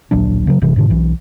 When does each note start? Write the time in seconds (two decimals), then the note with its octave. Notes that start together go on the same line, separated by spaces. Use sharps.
0.11 D1 A#1 F#3 D4
0.47 C#3 F#3
0.62 G1 G2 C3 E3
0.76 G#2 B2 D3
0.90 B1 E3